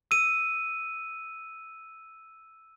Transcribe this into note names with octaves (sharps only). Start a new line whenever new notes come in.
E6 D#7